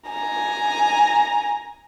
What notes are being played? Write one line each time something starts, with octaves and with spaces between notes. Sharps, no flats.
G#5 A#5